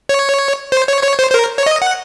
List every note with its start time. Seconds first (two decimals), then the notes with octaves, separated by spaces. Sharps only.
0.09 C#5
0.72 C5
0.88 C#5
1.03 C#5
1.19 C5
1.30 C5
1.34 A#4
1.58 C#5
1.66 D#5
1.82 F#5